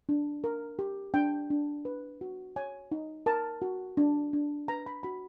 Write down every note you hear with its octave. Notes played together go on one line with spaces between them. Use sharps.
D4
A#4
G4
D4 G5
D4
B4
F#4
C#5 G#5
D#4
A#4 A5
F#4
D4
D4
B4 A#5
B5
F#4 B5